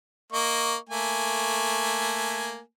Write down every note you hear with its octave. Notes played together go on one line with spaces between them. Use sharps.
A#3 D#5 C#6
A3 A#3 G#5